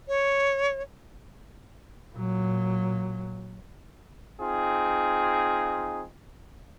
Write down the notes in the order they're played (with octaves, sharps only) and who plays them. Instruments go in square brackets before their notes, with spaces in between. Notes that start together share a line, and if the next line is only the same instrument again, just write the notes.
[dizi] C#5
[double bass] A#2 F#3
[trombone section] C4 D#4 F4 G#4